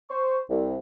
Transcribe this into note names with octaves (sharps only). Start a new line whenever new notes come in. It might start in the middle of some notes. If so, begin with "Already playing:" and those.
C5 C#6
C2